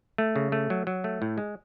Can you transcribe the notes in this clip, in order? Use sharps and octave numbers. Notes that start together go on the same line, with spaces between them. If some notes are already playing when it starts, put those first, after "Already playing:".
A3
C#3
A3
F#3
F#3
A3
A2
G#3